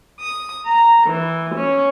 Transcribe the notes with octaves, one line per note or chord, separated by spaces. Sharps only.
D#6
A#5
E3
C#4